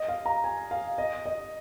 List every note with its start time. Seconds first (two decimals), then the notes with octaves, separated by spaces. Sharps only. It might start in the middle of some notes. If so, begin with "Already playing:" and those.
Already playing: D#5
0.08 F5
0.26 A#5
0.44 G#5
0.71 F5
0.98 D#5
1.26 D#5